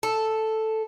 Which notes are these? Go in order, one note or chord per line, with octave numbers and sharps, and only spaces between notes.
A4